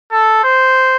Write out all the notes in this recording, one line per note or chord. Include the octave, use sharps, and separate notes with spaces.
A4
C5